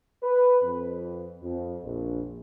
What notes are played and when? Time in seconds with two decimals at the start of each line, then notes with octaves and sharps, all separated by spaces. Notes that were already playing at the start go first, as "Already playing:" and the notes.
0.23 B4
0.62 F2
1.43 F2
1.83 A#1